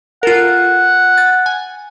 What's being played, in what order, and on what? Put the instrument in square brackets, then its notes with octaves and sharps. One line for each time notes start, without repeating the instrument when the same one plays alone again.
[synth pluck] F4 A4 A#4 [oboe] F#5
[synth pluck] A6
G#5